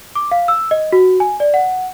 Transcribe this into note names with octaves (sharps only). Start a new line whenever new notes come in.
D6
F5
E6
D#5
F#4
G#5
D5
F#5